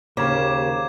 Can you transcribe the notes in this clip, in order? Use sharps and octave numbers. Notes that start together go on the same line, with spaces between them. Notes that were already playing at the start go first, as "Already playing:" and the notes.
D#2 C#3 A#3 G4 C5 D6 G#6 E7